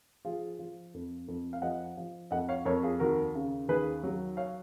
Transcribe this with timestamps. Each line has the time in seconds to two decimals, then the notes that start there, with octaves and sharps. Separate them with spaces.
0.25 F3 F4 G#4
0.59 F3
0.94 F2
1.28 F2
1.53 F5
1.62 F3 D#5 F#5
1.97 F3
2.31 F2 D#5 F#5
2.49 C#5 F5
2.65 F2 A#4 C#5
2.83 F4 G#4
3.00 D#2 F#4 A#4
3.35 C#3
3.68 D#2 G#4 B4
4.03 F#3
4.37 C#5 F5